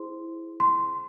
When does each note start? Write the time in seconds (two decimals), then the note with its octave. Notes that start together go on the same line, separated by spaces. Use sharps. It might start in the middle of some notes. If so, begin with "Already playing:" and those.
Already playing: E4 G#4 C5 C6
0.60 C6